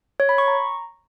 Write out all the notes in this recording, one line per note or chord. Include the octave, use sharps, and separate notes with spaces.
C#5
B5
C#6
A#5